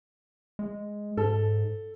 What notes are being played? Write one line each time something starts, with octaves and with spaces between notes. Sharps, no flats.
G#3
G#2 A4